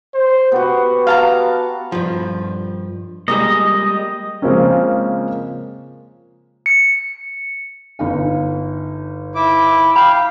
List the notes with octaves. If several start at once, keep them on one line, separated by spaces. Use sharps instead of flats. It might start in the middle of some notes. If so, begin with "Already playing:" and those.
C5
B3 F#4 G4
G4 F5 A5 A#5
G2 F3
G3 G#3 A#3 D#5
C#3 F3 G#3 A#3 C4 C#4
C#7
G1 D#4 F5
E4 D6
F5 G5 B5